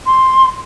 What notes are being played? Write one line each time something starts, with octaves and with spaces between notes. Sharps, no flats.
C6